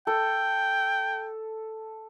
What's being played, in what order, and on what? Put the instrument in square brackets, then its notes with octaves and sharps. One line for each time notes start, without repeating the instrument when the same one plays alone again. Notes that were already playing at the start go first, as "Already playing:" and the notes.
[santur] A4 [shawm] G5